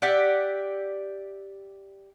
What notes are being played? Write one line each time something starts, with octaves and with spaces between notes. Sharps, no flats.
G4 D5 E5 F#5